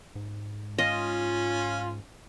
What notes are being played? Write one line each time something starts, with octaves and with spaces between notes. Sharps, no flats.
G#2
C#4 F4 D#5